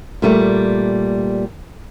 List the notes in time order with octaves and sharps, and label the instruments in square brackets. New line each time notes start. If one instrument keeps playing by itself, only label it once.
[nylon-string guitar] A#2 G3 A3